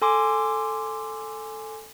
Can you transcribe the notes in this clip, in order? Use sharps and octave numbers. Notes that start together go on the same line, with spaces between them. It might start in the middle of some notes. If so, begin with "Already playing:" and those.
A4 G#5 C6 D6